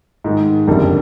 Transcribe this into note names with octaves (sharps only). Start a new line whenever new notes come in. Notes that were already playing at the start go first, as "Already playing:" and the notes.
G#2 D#3 G#3
F#1 F2 D3 G3